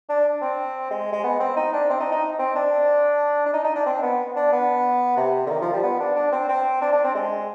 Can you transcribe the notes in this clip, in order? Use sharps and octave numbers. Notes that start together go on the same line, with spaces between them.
D4
C4
G#3
G#3
B3
C4
D#4
D4
C4
D#4
D#4
C4
D4
D4
D#4
D#4
D4
C4
B3
D4
B3
C3
D3
D#3
F3
G3
B3
D4
D4
C4
C4
D4
D4
C4
G#3